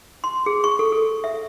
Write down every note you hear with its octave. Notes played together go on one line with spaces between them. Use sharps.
C6
G#4
C#6
A4
A4
E5